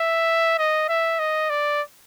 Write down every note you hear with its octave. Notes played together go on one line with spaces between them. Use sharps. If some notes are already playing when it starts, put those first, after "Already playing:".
Already playing: E5
D#5
E5
D#5
D5